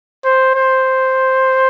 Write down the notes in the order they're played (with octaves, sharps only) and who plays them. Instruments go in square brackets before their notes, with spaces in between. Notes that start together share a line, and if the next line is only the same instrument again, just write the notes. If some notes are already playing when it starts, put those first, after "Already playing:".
[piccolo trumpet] C5
C5